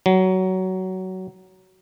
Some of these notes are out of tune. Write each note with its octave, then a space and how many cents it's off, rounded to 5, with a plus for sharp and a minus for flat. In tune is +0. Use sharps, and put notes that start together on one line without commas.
F#3 +15